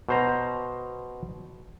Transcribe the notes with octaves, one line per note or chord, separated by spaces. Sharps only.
B2 C5 A#5